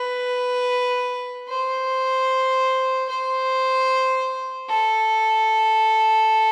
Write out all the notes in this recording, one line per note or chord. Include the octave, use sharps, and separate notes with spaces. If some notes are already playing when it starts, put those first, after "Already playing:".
Already playing: B4
C5
C5
A4